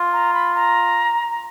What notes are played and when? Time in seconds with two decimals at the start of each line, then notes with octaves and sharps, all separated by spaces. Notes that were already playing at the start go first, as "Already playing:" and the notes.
Already playing: F4
0.13 A#5
0.34 B5
0.55 A#5